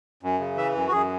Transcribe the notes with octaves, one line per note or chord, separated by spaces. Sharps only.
F#2
C#3
E3 E5
F#2
F#4
F#2 G#4